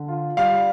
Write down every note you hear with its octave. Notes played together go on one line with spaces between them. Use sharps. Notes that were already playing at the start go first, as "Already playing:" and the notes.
Already playing: D3
F4
G3 F5